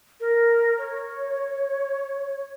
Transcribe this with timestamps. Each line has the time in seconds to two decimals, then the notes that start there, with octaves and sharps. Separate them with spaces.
0.20 A#4
0.78 C#5